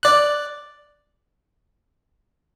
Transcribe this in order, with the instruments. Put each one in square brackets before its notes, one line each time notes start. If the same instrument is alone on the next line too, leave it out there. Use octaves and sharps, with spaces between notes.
[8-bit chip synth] D5 F#6